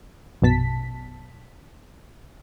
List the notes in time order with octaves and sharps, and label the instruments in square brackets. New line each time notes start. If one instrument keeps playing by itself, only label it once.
[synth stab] A#1 F#2 B2 A5 B6